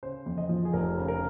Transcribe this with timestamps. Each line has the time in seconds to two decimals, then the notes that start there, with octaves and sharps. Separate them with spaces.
0.03 C#3 C5
0.26 F2
0.38 D#5
0.49 F3
0.65 G#4
0.73 F1 A#4
0.97 C#3
1.08 A#4